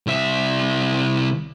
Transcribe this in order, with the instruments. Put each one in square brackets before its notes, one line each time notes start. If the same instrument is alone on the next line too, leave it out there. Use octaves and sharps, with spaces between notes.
[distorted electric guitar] C2 E5